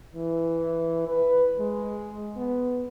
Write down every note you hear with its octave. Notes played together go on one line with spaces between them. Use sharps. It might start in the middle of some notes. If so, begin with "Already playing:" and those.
E3
B4
G#3
B3